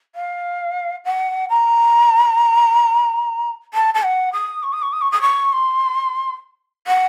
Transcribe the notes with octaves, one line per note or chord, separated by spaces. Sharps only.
F5
F#5
A#5
A5
A5
F#5
D#6
C#6
D#6
C#6
D#6
C#6
D#6
C#6
C6
F#5